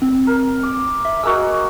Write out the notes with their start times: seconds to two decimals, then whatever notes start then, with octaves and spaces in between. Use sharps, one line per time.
0.02 C4
0.27 A#4
0.63 D6
1.05 E5
1.23 G#3 A#3 F#4 E6